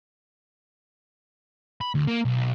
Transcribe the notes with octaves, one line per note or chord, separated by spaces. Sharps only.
B5
D2
A#3
B1